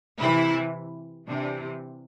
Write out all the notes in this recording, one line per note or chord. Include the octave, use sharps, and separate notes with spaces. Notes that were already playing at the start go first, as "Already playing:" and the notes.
C3 E3 E4
C3 E3 D4